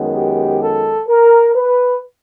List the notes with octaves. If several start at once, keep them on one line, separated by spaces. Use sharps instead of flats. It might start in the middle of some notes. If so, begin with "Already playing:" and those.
Already playing: F#2 D#3 G#3 B3
G4
A4
A#4
B4